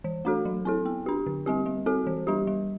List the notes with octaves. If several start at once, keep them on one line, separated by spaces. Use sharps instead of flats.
E3
A3 D4 F#4 A4
F#3
C4 E4 A4
B3
D4 G4
D3
G3 C4 G4
G3
C4 F#4 A4
E3
G3 D4 G4
G3